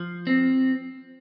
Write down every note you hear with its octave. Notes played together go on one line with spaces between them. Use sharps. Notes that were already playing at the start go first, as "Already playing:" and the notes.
Already playing: F3
C4